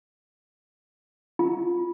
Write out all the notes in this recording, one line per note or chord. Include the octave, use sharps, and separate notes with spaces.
F4